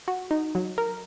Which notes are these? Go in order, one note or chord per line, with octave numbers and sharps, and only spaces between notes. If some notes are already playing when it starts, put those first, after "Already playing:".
F#4
D#4
F#3
A#4